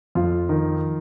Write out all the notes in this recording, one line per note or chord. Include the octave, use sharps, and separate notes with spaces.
F2 F4
D#3